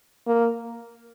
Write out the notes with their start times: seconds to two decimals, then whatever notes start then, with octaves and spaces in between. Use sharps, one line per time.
0.27 A#3